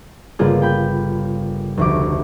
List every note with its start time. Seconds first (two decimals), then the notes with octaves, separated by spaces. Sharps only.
0.39 G1 C#3 A#3 F4 G#4 G#6
0.62 G5 B5 G6
1.77 F1 D2 D6